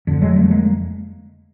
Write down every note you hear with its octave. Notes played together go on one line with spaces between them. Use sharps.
F1 F2 D3
F#3 G#3
G3 A3
G#3 A#3